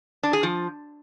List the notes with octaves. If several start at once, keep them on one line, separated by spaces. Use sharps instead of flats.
D4
G#4
F3